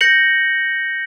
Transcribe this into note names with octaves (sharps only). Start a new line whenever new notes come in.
G6 A#6 C#7 F#7